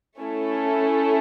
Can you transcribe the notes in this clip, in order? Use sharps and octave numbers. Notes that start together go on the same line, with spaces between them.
A3 C#4 E4 A4